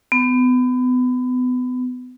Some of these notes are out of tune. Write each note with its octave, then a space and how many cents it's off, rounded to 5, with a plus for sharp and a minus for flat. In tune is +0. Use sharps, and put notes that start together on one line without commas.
B3 +30